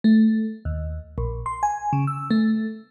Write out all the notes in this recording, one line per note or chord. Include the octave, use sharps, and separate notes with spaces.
A3
D#2
A#1
C6
G#5
C#3
E6
A3